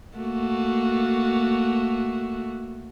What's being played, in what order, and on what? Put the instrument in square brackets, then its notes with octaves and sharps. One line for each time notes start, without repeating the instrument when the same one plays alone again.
[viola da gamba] A3 A#3 F#4